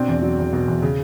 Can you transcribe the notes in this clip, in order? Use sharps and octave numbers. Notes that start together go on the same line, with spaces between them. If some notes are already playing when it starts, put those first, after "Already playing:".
Already playing: B2 C4 D4
E2
F#3
E2
B2
E2
C#3